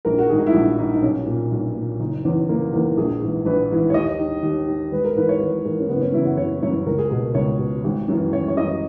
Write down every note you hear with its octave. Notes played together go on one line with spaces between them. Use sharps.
A#1 A#4
F#4
G#2 D#3 G#4
D#4
E4
A#1 F#4
G#2 D#3 D#4
D#4
B1 C#4
A#2
B1
A#2
F#1 D#4
E2 D#3 C#4
F#1 A#3
E2 D#3 A#3
A#1 G#4
G#2 E3
A#1 B4
G#2 E3
C#5
D#2 D#5
D#3
D#2
D#3
G#1 B4
A#4
G#2 E3 B4
C#5
G#1 B4
G#2 E3 A#4
C#4
F#1 B3
C#4
F#2 C#3 E3 E4
F#4
F#1 C#5
F#2 C#3 E3 C#5
C#2 A#4
G#4
B2 A#4
C#2 C#5
B2
G#1
F#2 E3
G#1 C#5
C#5
F#2 E3 D#5